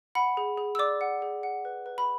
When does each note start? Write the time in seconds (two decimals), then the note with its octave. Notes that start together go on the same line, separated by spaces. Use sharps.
0.15 F#5 B5
0.37 G#4
0.58 G#4
0.75 E6
0.79 D5 D6
1.01 F#5
1.22 G#4
1.43 F#5
1.65 B4
1.86 B4
1.98 B5